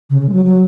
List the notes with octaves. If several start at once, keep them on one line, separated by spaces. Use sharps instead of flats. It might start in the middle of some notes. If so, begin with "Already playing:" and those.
C#3
C#3
G#3
F#3
F#3